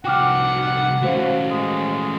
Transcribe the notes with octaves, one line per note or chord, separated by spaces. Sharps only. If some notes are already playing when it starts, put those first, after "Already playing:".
C2 F#4 F#5 G5 D6 F6
A3 C#4 F#4 C5 F5
G#3